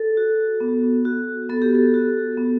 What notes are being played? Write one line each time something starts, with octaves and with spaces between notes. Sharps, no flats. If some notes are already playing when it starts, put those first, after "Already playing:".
Already playing: A4
F#4
B3
F#4
B3 A4
G4
A4
F#4
B3